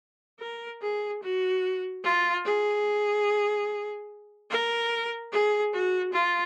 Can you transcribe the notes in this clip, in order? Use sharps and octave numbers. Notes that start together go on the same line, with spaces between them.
A#4
G#4
F#4
F4
G#4
A#4
G#4
F#4
F4